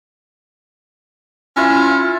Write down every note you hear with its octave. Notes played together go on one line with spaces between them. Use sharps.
C#4 E4 F4 E5